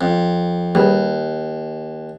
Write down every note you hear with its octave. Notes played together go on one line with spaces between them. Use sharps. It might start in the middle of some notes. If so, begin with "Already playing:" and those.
F2
D#2 G3 G#4 B4